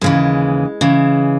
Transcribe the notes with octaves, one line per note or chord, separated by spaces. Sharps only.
D#2 C#3 E3 G#3
C#3 E3